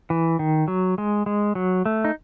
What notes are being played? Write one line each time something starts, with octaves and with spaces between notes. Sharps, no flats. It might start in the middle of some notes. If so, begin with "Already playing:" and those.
E3
D#3
F#3
G#3
G#3
F#3
A3
D#4